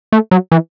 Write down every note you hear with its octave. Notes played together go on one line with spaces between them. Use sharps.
A3
F#3
E3